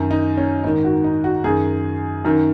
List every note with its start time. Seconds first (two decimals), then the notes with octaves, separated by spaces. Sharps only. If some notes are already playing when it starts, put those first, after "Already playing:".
Already playing: F#2 D#3
0.11 D#4
0.37 C#4
0.64 G#2 D#4
0.67 D#3
0.84 F#4
1.04 D#4
1.24 F#4
1.44 F#2 D#3 G#4
2.25 F#2 D#3